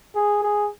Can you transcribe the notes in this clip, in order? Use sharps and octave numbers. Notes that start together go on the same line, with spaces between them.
G#4
G#4